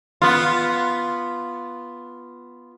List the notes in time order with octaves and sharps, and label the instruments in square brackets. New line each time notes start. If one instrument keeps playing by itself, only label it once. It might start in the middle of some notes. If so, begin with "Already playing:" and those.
[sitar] B3 F4